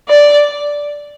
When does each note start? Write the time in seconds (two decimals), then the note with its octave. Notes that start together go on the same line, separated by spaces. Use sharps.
0.08 D5